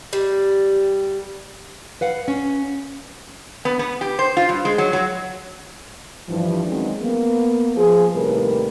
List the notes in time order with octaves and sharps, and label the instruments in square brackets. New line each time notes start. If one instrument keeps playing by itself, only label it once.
[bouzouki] G3
[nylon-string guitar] B4 F5 F#5
C#4
[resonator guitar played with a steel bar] B3
B3
G4
C5
F4
G2
G#3
F#3
F#3
[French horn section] G2 E3 F3
D#3 F#3 G#3 C4 C#4 D#4
A#3 B3
F3 G#4
D#2 A2 C3 G3 A#4 B4